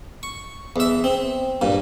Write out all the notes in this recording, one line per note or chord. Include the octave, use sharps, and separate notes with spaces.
C#6
E2 E5
C4
G2 A#2